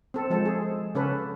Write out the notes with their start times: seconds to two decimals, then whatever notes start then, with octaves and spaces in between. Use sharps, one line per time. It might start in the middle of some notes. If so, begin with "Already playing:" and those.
0.14 C4 A4
0.30 F3 G#3 A4 C5
0.45 G#4
0.95 C#3 C#4 A4 B4